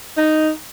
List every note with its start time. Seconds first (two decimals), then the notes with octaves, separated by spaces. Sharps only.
0.17 D#4